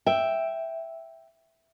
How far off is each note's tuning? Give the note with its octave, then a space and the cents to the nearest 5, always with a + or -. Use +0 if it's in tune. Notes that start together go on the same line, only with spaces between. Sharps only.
E5 +0 G5 +0